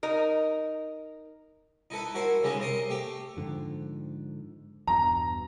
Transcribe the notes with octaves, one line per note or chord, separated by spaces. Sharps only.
D#4 A#4
D#4 E4 A4 B4
E4 F#4 A#4 C5
C#3 G3 G#3 D#4 E5
C3 A#4 D#5 C6
A3 G4
G#2 D3 F3
E2 G2 B2 A#5